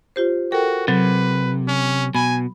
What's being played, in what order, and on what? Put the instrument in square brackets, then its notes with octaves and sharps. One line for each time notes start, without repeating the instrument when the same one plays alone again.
[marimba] F4 G4 C5
[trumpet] F#4 [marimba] A4 A#4 G5
[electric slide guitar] C3 [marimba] F#3 [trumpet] B4
[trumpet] C#4
[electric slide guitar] B2 [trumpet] G#5 [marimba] B5